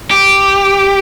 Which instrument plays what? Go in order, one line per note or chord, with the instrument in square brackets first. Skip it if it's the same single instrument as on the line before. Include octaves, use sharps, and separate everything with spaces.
[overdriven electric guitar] G4